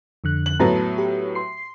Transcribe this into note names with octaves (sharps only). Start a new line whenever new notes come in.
F2 D3 F#6
F#7
A2 F#3 B3 A5 A#5
G4
C6 C7